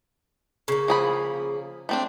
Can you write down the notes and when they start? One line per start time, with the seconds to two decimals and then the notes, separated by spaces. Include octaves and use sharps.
0.68 C#3 A#3
0.88 F3 G#4 B5
1.89 A3 C4 D4